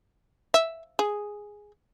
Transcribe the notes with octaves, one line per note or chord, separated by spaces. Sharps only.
E5
G#4